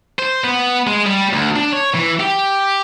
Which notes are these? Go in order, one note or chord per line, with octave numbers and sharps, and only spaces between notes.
C5
B3
G#3
G3
D2
D4
C#5
E3
G4